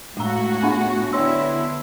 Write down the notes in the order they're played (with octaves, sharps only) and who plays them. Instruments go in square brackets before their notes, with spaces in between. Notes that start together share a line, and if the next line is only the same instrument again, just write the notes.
[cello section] A2 F#4 [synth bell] G#3 A#5
[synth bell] B3 D4 F#5
[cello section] D3 B3 E4 [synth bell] C#5 C6 E6